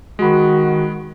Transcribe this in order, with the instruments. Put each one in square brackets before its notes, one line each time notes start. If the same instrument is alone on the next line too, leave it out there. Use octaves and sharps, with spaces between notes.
[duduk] D#3 [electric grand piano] G#3 B5 [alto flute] F#4